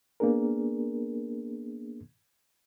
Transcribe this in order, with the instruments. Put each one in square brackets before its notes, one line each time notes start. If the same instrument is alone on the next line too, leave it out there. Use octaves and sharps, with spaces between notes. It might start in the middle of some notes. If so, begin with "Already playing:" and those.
[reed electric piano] A#3 B3 D4 G#4 A#4